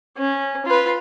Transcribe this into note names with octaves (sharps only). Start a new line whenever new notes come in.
C#4
F4 B4